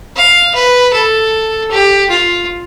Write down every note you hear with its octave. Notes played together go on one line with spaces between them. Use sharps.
F5
B4
A4
G4
F4